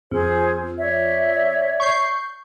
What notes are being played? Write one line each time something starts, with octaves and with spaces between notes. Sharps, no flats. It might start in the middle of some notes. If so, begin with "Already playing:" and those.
F2 G#4 C5
C#5 D5 E5
C#6 G6 C7